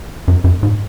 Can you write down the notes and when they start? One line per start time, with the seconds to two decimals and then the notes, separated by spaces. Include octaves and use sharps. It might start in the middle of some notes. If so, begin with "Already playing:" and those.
0.28 F#2
0.44 F#2
0.63 G#2